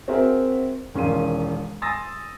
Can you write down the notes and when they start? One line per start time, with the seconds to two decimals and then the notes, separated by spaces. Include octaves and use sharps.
0.08 C4 F#4 G#4 A#4 E5 F#5
0.94 E1 D#3 C#4 F5 C6 D#7
1.82 G#5 C6 D#6 E6 A6 A#6